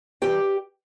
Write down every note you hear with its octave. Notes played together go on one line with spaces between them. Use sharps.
G2 E3 G3 G4 G5